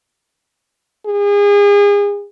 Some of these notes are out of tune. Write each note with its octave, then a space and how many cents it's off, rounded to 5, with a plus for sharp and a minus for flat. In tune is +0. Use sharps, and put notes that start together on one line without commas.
G#4 -35